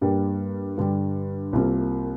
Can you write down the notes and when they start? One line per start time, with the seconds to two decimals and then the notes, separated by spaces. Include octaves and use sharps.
0.01 G2 G3 A#3
0.78 G2 D3 G3
1.53 C2 C3 A#3 F4 A#4